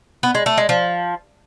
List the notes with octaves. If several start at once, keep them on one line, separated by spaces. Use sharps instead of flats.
B3
G#3
A3
G#3
F3